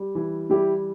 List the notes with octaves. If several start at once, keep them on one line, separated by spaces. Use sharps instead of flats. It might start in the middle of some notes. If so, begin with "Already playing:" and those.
Already playing: G3
E3
G3 E4 G4